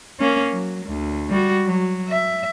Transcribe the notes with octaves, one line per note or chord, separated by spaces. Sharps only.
A#3 C#4
F#3
D2
G3 F#4
F#3
E5